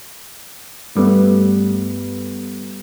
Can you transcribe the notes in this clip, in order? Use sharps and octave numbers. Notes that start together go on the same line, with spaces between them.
G2 G3 A3 B3